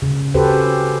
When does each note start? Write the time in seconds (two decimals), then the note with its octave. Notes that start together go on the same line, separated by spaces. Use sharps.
0.02 C#3
0.34 C#4 F#4 G4 A4 B4 C5